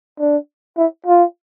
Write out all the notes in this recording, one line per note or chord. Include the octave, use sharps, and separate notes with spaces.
D4
E4
F4